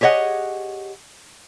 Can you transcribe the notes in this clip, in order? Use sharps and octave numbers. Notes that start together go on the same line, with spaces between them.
G4 G#4 C#5 D#5 F#5